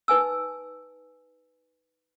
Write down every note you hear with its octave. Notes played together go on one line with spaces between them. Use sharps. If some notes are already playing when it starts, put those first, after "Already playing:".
D#4 B4 G#5 E6